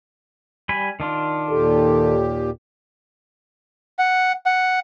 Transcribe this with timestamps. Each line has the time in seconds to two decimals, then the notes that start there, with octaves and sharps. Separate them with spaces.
0.69 G3 G#5 B5
1.00 D#3 D4 F4
1.50 D#2 A#2 G4 A4
3.99 F#5
4.46 F#5